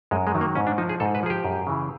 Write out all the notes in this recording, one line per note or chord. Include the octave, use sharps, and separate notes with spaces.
F#2 G#3
G#3
D#3 F#3
A#3
G#2 C#4
D4
F3 D#4
G#4
G#2 A4
B4
F3 G#4
G4
F#2
C#3 E3